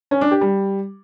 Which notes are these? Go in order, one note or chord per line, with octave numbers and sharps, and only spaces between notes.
C#4
D4
G4
G3